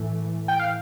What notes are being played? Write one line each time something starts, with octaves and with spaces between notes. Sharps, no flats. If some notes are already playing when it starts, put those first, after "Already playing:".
Already playing: A2 E3 A3
G5
F5